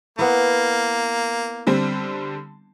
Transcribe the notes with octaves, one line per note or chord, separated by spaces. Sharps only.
A#3 B3 E4
D3 G3 C4